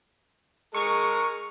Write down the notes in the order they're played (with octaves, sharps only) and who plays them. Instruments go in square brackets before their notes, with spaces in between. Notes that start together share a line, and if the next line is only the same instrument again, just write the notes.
[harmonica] G#3 A#4 [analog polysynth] C#6